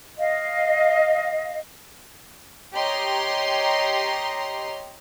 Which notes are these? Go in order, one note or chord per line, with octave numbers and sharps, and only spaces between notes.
D#5 F5
G4 C#5 D#5 A#5 C6